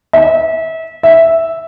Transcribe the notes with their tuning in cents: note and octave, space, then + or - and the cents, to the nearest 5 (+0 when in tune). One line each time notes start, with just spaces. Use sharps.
E5 -30
E5 -5